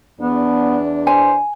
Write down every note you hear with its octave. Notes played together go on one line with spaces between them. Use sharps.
E2 B3 D4
C5 G#5